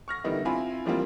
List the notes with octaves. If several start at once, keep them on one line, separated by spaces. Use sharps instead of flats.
C#6 F6 A#6
D3 D#3 G3 B3 D#4 E4
C4 E4 F4 G#5 B5
E3 F3 G3 A#3 C4 F4